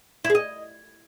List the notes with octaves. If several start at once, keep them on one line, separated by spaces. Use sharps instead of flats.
E4
G#4
D#5